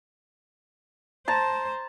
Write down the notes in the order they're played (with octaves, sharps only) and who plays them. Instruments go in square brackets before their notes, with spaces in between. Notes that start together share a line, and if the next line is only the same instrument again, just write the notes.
[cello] C5 [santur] A5 A#5